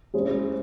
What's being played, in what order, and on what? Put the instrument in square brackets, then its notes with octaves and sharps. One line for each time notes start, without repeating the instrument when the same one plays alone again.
[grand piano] G#3 C#4 E4 G#4 C5